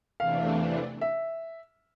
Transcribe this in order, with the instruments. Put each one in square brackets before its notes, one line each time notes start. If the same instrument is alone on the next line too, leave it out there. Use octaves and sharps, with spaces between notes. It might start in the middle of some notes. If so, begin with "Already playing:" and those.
[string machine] E2 C3 E3 A3 D4 [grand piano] F5
[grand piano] E5